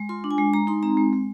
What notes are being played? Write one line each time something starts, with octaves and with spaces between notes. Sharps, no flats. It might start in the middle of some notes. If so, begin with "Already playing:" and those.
Already playing: G#3
F4 C6
D4
G#5
G#3
G#3 A#5
D#4 C6
C4 A#5
G#3
G#3